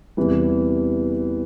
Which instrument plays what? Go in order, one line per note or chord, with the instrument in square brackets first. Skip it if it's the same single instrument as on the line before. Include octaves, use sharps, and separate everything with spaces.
[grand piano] E2 C3 E3 G3